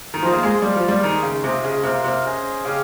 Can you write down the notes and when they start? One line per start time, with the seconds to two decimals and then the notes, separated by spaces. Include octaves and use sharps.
0.14 D#3
0.22 F3 F4 G#4 C5 D#5
0.33 A#3
0.43 G#3
0.62 G3 F4 C5 F5
0.76 F3
0.88 G3
1.03 D#3 G#3 D#4 G#4
1.23 C#3
1.44 C3 F4 G#4 D#5
1.64 C#3
1.83 C3 F4 A#4 F5
2.04 C3
2.24 C#4 G#4 C5 D#5
2.65 C#3 C#4 G4 C#5 F5